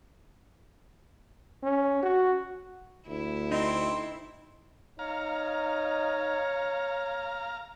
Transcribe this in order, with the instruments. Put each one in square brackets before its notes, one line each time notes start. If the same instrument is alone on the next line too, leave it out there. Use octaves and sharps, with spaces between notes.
[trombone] C#4
F#4
[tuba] D2 [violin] E4
[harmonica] C4 [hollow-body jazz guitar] D#4
[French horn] D#4 [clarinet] C#5 [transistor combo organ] F5 A#5